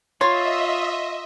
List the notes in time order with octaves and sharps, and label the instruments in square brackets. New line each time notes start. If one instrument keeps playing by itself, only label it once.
[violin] F4 [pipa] C#5 [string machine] D#5 E5 [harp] C6 A6